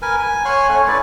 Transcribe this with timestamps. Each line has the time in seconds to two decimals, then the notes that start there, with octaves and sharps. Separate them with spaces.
0.02 A#4 B4 G#5
0.19 G#5
0.45 C#5 F#5 G#5 C6
0.68 A3 C#4
0.88 C#4 E4 B4 D5